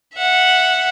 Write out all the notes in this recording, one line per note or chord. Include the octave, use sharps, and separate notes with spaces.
E5 F#5